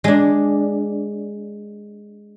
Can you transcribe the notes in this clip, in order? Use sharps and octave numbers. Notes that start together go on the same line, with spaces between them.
G#3 D4